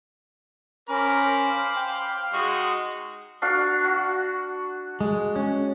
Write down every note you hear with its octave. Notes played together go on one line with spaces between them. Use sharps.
C#4 A#4 C5 B5 D6
F5
G5
G#3 D#4 F#4 C#6
D4 F#4 F5
F#4
G#3
C#4